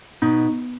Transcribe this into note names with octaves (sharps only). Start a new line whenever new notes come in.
B2 D#4